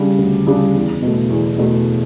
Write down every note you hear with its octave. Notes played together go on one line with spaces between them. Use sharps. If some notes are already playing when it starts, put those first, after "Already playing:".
Already playing: C#3 G3 D4
D2
C#3 G3 D4
E2
B2 A3
E2
B2 A3